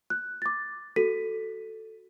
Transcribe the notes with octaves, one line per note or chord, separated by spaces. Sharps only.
F#6
D6 A6
F#4 A4 B6 D#7